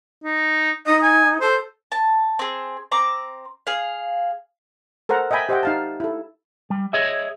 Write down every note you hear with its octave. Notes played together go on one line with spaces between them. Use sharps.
D#4
D#4 D#5
G#5
A4 C5
A5
C4 G#4
C4 A#5 D6
G#4 F5
A4 A#4 C5 F#5 A#5
D#5 E5 G5 G#5 B5
G4 C5 D#5 E5 F#5 G5
D#4 F5 A5
E4 A4
G3
G#4 C#5 D#5 E5